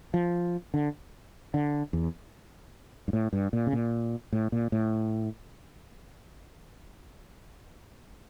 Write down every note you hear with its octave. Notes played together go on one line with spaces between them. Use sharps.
F3
D3
D3
E2
G2
A2
G2
A#2
C#3
A#2
A2
A#2
A2